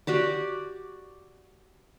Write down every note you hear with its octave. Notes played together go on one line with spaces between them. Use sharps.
F#4 G4 D5